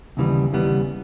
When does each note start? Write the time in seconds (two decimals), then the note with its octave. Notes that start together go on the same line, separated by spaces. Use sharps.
0.17 D#2 C#3 E3 G3 B3
0.52 D#2 C#3 E3 G3 B3